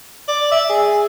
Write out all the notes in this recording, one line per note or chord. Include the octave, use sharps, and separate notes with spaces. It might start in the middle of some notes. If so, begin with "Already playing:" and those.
D5
E5
G#4